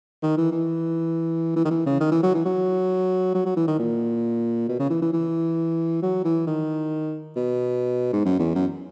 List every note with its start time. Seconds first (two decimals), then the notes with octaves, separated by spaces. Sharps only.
0.22 D#3
0.37 E3
0.52 E3
1.56 E3
1.65 D#3
1.71 E3
1.86 C#3
2.00 D#3
2.12 E3
2.23 F#3
2.35 E3
2.45 F#3
3.35 F#3
3.46 F#3
3.57 E3
3.68 D#3
3.79 A#2
4.69 B2
4.79 C#3
4.90 E3
5.02 E3
5.13 E3
6.02 F#3
6.24 E3
6.47 D#3
7.36 B2
8.13 G#2
8.25 F#2
8.39 E2
8.55 F#2